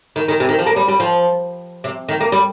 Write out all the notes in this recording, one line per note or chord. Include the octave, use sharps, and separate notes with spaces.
D#3
D#3
C3
D#3
F3
A#3
G3
G3
F3
C3
D#3
A#3
G3